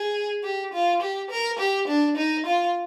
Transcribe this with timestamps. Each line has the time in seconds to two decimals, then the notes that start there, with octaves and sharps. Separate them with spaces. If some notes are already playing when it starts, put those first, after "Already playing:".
Already playing: G#4
0.44 G4
0.73 F4
1.02 G4
1.30 A#4
1.59 G4
1.88 D4
2.17 D#4
2.46 F4